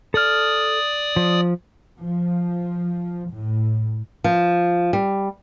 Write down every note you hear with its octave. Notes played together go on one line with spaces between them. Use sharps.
A4 D5 D#6 F6
F3
F3
A2
F3
G3